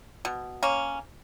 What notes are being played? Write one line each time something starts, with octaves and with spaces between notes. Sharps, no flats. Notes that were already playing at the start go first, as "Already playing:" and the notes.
B2
A#3 C#4